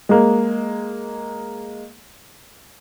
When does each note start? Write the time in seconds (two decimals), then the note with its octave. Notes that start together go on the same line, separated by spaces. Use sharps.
0.09 G#3 A#3